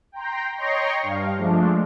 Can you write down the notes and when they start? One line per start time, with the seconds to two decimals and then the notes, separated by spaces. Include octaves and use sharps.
0.12 G5 A#5 C6
0.55 C#5 D#5 G5 A#5 C6 C#6
1.03 G2 F5
1.37 F3 G#3 A3 D4